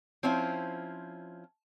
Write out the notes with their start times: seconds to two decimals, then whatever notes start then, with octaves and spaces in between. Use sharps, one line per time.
0.23 F3 C4 C#4 E4 F4